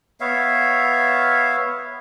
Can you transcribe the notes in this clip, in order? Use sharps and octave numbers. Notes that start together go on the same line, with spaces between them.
B3 C#5 E5 F5